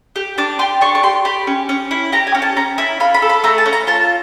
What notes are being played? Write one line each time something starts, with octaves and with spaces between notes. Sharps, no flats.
G4
D4 D6
G4 C6
D4 C#6
C#6
G4 C6
G4 B5
C#4
C#4
E4
G4 A#5
G#5
C#4
A5
C#4 A#5
E4 B5
F4 B5
B5
A4
B5
A3 A#5
A5
C#4
A#5
F4 A5